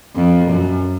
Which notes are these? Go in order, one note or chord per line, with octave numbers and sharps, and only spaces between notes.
F2
F#2